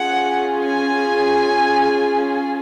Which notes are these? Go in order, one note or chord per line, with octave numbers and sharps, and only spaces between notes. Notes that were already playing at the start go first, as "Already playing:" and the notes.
Already playing: C#4 F4 G#4 F#5
G#5